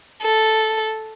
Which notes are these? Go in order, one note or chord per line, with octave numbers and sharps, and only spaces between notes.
A4